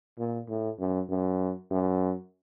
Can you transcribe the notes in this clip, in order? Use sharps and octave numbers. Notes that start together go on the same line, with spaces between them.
A#2
A2
F#2
F#2
F#2